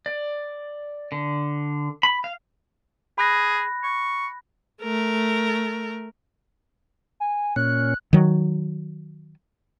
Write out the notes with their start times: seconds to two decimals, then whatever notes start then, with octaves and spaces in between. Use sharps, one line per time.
0.06 D5
1.12 D3
2.03 B5
2.24 F5
3.18 G#4 B5 F#6 A#6
3.83 C#6
4.82 A3 A#4
7.20 G#5
7.56 A#2 C#4 F#6
8.13 D#3 F#3